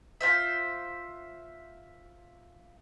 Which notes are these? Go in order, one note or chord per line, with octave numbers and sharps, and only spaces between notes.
F4 C5 E5